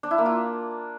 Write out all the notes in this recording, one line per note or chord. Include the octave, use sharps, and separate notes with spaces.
D4
E4
A#3
F4